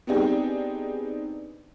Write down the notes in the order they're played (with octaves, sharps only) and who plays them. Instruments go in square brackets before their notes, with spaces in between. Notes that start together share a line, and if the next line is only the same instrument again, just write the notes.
[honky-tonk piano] B3 C4 D4 D#4 G4 G#4